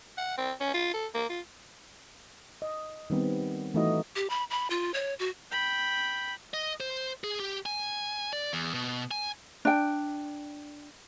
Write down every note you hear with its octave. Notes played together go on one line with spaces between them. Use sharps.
F#5
C4
C#4
F4
A4
A#3
F4
D#5
D#3 G3 B3 C4
E3 A3 D#4 E4 F#4 D#5
G4
B5
B5
F4
C#5
F#4
G5 B5
D#5
C5
G#4
G4
G#5
D5
E2
B2
G#5
D4 G5